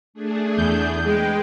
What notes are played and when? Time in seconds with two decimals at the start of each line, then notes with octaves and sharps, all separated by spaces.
0.14 A3 D4 G#4
0.57 E2 G6
1.06 G#3 B4 G5